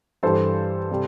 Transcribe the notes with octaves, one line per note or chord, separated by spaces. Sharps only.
G2 E3 G3 A4 C5
C3 G3